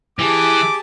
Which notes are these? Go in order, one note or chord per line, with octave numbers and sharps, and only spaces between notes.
E3 G4 G#4 A5 D6